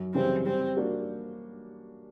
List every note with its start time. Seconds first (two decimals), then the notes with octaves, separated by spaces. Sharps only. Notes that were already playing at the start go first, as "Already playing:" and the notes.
Already playing: F#2
0.14 C#3 E3 G3 C4
0.46 G3 C4
0.77 A#3 D4 F#4